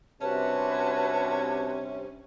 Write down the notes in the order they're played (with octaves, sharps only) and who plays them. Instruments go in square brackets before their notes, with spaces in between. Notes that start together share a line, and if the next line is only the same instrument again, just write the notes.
[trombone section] G2 C3 [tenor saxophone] C#4 [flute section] F#4 B4 A5